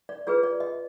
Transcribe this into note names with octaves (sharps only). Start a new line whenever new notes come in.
D5
F4 G#4 B4 C#5
D5
D#5